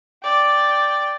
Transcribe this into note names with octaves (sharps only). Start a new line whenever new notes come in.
D5 G5